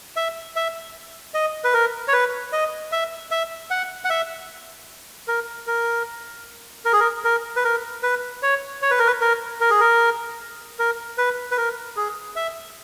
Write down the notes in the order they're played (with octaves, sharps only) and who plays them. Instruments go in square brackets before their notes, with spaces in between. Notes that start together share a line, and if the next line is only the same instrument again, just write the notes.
[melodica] E5
E5
D#5
B4
A#4
C#5
B4
D#5
E5
E5
F#5
F#5
E5
A#4
A#4
A#4
G#4
A#4
A#4
B4
A#4
B4
C#5
C#5
B4
A#4
B4
A#4
A#4
G#4
A#4
A#4
B4
B4
A#4
G#4
E5